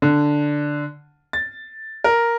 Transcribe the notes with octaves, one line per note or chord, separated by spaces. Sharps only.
D3
A6
A#4